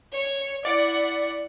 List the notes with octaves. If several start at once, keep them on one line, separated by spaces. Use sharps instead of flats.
C#5
E4 D5 F#5